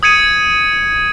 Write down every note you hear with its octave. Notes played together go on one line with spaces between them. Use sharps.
D#6 G#6 C#7 D#7